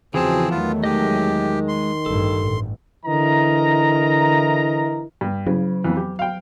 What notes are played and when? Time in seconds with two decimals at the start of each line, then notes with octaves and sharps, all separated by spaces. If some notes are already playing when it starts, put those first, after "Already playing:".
0.14 E2 C#3 E3 F3 C4 F#4 G#4 A5
0.50 E2 D#3 F#3 A3 B3 F4
0.84 G#3 G4 D#5
1.68 C6
2.06 A1 G2 A4
2.42 A1
3.06 D3 E3 E4 A#4 D#5 A#5
5.21 G2
5.47 C#3 F#3
5.84 F2 E3
5.97 G4
6.19 F5 G5